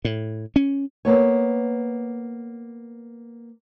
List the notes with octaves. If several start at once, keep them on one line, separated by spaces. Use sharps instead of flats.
A2
C#4
A#3 B3 C#5